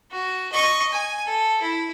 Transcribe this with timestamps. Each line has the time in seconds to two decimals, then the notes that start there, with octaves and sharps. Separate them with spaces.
0.11 F#4
0.52 D#5 C#6
0.92 G#5
1.26 A4
1.62 E4